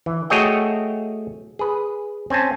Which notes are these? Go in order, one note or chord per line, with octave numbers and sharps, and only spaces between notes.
E3
A3 F#4 G#4 C#5 D#5 G5
G#4 B4
C4 C#4 G#5 A5